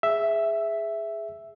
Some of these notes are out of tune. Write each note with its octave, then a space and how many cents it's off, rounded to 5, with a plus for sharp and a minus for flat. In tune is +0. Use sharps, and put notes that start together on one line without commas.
G#4 +0 E5 +0